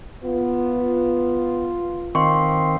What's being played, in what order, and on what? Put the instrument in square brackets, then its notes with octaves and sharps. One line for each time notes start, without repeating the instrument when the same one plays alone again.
[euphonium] B3 [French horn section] F4
[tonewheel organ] D#3 C4 [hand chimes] F5 C6 C#6